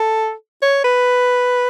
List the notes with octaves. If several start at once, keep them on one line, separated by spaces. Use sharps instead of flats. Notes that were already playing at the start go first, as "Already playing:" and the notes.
Already playing: A4
C#5
B4